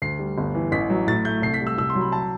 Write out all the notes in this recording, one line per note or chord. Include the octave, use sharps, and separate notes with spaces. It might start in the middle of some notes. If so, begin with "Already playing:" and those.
D2 C7
G3
G1
E3
A1 B6
F#3
A2 A6
A3 G6
C2 C7
B6
G3
E6
C2 E6
C6
F#3
B5
A5